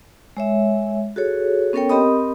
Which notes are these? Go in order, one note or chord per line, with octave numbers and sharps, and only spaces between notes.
G#3 C#5 E5
F#4 G#4 A4 C#5
B3 C#4 A4 A#4 C#5 G5
C4 G4 A#4 D#5 B5 D#6